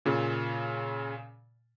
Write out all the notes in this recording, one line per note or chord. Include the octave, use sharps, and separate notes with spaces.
A#2 C#3